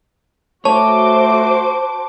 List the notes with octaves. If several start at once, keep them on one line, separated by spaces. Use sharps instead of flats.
A3 F#4 C5 C#5 A5 D6